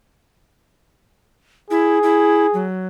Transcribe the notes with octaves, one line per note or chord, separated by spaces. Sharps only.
E4 G#4
E4
F#3